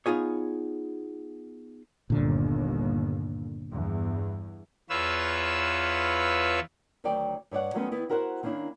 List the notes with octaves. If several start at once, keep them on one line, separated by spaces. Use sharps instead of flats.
B3 D#4 F4 G#4 C#5
G1 D#2 A#2 D3
E2 G2
E2 F4 B4 C#5 E6
D2 D#3 F#3 D5 G5
G2 C#5 D5 F#5
D#3 F#3 G#3 A3 B3 C#4
D#3 B3 E4
E4 F#4 A#4 C5 E5 F#5
D#3 A#3 C#4 D4 E4